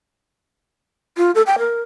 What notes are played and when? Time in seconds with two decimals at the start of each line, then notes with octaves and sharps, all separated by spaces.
1.17 F4
1.35 A4
1.47 G5
1.59 A#4